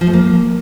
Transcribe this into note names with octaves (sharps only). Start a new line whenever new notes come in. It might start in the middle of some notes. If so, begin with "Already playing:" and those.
F3
A3
A#3